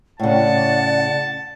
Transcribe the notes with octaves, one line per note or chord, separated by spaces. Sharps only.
A2 C#3 D5 F#5 A5